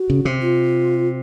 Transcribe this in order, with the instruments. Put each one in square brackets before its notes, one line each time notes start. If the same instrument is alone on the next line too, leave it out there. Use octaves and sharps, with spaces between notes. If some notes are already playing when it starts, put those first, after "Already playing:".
Already playing: [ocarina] F#4
[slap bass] C#3
C3
[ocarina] F4